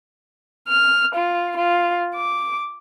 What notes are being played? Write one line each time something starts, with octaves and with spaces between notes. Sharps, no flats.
F6
F4
F4
D6